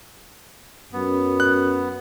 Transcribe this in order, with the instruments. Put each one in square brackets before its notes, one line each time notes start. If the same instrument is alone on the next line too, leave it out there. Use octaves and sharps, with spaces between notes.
[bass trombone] F#2 [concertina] B3
[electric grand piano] F#6